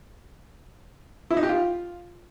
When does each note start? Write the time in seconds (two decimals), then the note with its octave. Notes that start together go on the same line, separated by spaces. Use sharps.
1.30 E4
1.37 D#4
1.43 G4
1.49 F4